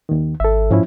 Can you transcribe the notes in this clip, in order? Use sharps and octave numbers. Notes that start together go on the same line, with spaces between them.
D#2 D#3
G#1 A4 E5
G#2 F3 C#4 E4